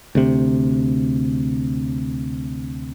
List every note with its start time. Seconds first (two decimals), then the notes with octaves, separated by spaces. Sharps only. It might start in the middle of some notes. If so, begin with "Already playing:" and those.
0.15 D2 C3